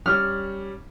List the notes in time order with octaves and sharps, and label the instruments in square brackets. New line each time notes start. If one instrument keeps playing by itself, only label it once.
[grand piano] G3 C#4 [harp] F6